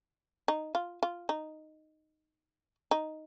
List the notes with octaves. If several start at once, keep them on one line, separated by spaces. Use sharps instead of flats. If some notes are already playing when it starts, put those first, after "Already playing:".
D#4
F4
F4
D#4
D#4